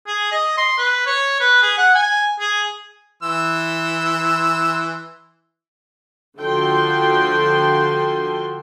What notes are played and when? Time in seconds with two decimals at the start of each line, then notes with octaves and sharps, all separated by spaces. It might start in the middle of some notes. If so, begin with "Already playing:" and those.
0.08 G#4
0.32 D#5
0.58 C6
0.78 B4
1.07 C#5
1.40 B4
1.62 G#4
1.78 F#5
1.95 G#5
2.40 G#4
3.23 E3 C6 E6
6.39 D3 F3 F#4 A4 G5 C6